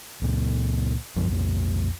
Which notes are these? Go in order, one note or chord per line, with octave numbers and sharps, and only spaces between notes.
C#2 A#2
B1 F#2 F3
B1 F2